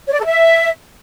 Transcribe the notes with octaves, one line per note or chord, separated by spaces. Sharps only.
C#5
D5
A4
E5